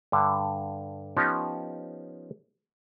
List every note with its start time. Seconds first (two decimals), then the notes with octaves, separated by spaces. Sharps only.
0.12 G2 D3
1.17 F3 B3 C#4 D#4 G4 C#5